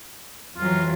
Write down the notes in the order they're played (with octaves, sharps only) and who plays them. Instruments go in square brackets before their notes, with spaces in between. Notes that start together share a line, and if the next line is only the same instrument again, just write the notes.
[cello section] F2 E3 F#3 [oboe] F4